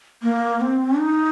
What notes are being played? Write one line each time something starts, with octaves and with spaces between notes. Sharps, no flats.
A#3
C4
D#4